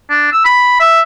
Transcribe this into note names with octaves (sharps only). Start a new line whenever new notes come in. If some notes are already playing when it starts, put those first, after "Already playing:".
D4
E6
B5
E5